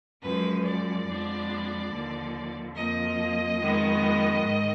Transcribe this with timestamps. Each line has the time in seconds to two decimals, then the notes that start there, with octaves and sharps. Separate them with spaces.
0.22 F#2 F3 G#3 B4
0.65 D5
1.07 F2 F3 G#3 B3 D4
1.91 D#2 D3 F3
2.74 F2 F3 A#3 D#5
3.59 F2 D#3 G#3 B3
4.43 G#2 D#3